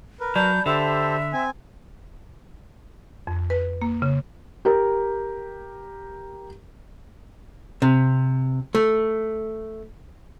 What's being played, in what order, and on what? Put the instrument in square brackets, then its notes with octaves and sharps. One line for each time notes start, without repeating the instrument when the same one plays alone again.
[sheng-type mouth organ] A#4 B4
[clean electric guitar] F#3 [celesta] D5 A5 B5 [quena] G6
[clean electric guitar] D3 [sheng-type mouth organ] G4 A4 C5 [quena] E5
[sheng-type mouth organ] C4 G#5
[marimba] F2
B4
A#3
C#3
[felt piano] G4 A#4
[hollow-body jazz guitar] C3
A3